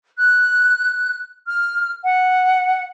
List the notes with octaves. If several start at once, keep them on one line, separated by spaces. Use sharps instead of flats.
F#6
F6
F#5